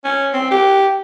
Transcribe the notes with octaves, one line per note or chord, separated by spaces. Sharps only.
C#4
C4
G4